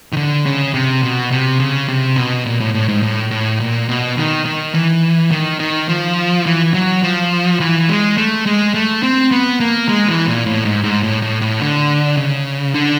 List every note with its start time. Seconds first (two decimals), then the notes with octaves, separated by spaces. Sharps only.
0.13 D#3
0.17 D3
0.46 C#3
0.74 C3
1.03 B2
1.31 C3
1.60 C#3
1.88 C3
2.17 B2
2.46 A#2
2.60 A2
2.74 A2
2.89 G#2
3.03 A2
3.31 A2
3.60 A#2
3.89 B2
4.17 D#3
4.46 D#3
4.74 E3
5.31 D#3
5.60 D#3
5.89 F3
6.46 E3
6.74 F#3
7.03 F3
7.60 E3
7.89 G#3
8.17 A3
8.46 G#3
8.74 A3
9.03 C4
9.31 B3
9.60 A#3
9.89 G#3
10.08 E3
10.27 A#2
10.46 A2
10.65 G#2
10.84 G#2
11.03 A2
11.22 A2
11.41 A2
11.61 D3
12.17 C#3
12.74 D3